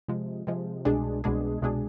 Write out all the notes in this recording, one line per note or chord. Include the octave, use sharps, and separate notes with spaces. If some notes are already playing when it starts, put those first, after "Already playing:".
C3 F3 G#3
C3 F3 G#3
C2 B2 G#3 D4 G#4
C2 B2 G#3 D4 G#4
C2 B2 G#3 D4 G#4